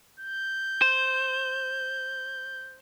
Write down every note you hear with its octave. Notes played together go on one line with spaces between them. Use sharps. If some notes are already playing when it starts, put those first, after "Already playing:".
G6
C5